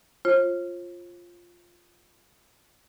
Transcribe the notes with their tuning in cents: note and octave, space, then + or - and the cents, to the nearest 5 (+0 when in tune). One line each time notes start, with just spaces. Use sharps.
F4 +0 C5 +45